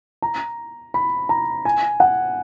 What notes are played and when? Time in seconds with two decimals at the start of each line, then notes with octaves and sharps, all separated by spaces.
0.22 A#5
0.94 B5
1.29 A#5
1.65 G#5
2.00 F#5